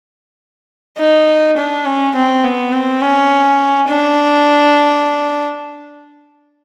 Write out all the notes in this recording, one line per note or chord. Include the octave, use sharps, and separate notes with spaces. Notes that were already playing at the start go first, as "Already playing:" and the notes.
D#4
D4
C#4
C4
B3
C4
C#4
D4